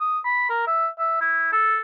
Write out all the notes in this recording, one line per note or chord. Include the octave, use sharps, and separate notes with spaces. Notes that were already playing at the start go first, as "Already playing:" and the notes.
D#6
B5
A#4
E5
E5
E4
A4